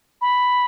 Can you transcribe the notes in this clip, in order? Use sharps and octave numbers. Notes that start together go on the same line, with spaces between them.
B5